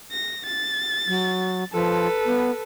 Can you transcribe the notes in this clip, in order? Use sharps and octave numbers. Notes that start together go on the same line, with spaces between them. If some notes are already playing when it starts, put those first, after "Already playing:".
A#6
A6
F#3
F3 A4 B4
B3